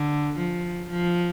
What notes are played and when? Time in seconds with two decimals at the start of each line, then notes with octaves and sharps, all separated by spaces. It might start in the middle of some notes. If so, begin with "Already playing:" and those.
Already playing: D3
0.37 F3
0.90 F3